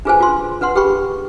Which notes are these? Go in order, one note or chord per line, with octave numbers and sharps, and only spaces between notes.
D4 F4 G#4 B4 C5 G#5
F4 C6
D4 B4 F#5 C6
G4 G#4 B4 G5 B5 C#6